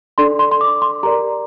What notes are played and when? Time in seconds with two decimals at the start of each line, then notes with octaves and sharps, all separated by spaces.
0.18 D4 A4 D5 C6
0.39 C6
0.52 C6
0.61 D6
0.82 C6
1.03 G4 A#4 D5 A#5